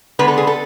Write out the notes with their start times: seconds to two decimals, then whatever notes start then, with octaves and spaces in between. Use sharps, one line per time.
0.19 D3 G#3 B3 B4
0.28 A4
0.37 G#4
0.47 A4